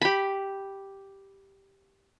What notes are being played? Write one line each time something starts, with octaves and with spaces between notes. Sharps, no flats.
G4 B5